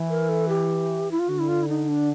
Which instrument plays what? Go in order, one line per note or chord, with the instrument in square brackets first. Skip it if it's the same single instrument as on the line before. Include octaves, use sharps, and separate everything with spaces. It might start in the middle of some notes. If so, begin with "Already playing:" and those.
Already playing: [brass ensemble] E3
[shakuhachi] A#4
A4
G4
E4
F4
[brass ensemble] D3 [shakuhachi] F#4
[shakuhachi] E4
F4
E4
D#4
D4